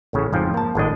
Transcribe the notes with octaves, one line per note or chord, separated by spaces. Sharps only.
A1 A2 C#3
F2 G#2 F3 G5
A#3 A5
G#1 A2 D4 D#5